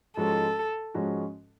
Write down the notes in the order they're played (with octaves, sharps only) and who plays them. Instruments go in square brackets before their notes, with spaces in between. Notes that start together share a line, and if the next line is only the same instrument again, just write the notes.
[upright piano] G#2 F3 G#3 C#4 F#4 [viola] A4
[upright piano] G#2 F3 G#3 C#4 F#4